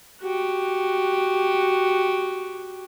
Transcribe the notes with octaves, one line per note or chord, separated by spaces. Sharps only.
F#4 G4